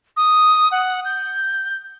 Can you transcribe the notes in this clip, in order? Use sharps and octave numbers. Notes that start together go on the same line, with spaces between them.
D#6
F#5
G6